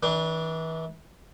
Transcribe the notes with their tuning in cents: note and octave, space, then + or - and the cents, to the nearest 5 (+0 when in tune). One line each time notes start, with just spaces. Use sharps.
E3 -35 D4 +0